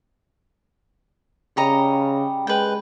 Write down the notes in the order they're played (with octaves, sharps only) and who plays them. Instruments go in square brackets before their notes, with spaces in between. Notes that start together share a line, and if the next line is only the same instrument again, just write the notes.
[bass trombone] C#3 [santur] G3 [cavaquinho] C#5 D#5 A#5
[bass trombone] G#3 [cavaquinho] B4 G5